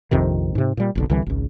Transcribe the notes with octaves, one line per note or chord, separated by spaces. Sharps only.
A#1 F2 C3 D#3
G#2 C3
A#2 G3
F#1 B1 D3
C2 D3 E3 G3
G#1 C#2